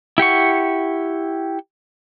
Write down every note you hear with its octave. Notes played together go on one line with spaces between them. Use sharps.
E4 G4 F#5 C#6